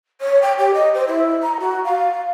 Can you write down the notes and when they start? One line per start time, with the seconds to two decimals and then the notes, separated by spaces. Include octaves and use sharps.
0.21 C#5
0.42 G5
0.58 G4
0.74 D#5
0.94 C5
1.08 E4
1.42 A#5
1.59 F#4
1.84 F5